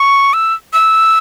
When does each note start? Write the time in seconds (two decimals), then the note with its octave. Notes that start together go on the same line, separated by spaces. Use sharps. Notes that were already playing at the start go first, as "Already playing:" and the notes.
Already playing: C#6
0.33 E6
0.73 E6